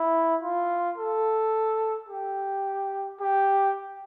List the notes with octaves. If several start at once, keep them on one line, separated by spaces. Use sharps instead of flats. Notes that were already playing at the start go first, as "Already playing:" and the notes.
Already playing: E4
F4
A4
G4
G4